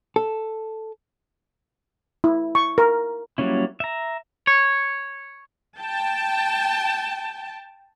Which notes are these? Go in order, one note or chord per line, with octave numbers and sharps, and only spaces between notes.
A4
E4
C#6
A#4
F#3 G3 A#3 C#4 E4
E5 A#5
C#5
G5 A5